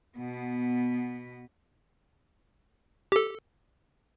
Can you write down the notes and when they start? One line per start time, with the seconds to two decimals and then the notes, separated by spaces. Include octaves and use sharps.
0.18 B2 B3
3.12 G4 A4